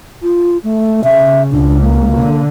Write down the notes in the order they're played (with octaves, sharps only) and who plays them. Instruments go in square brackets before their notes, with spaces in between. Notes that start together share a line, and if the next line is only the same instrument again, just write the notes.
[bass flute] F4
A3
[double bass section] C#3 [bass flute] E5
[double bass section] C#2 [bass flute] D4
[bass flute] A#3
[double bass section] D3